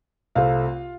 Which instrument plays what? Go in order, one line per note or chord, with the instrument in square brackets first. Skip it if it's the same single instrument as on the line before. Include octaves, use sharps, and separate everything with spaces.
[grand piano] C2 C3 A3 C4 F4 F5